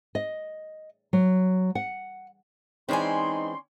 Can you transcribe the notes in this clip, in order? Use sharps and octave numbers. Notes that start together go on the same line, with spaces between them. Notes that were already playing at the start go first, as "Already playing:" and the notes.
D#5
F#3
F#5
E3 G#3 C4 C#4 D#4 D5 G#5 C6